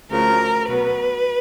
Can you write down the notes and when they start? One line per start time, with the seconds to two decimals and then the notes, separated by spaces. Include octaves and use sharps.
0.10 D2 C#3 F3 A#4
0.67 B2 F#3 B3 B4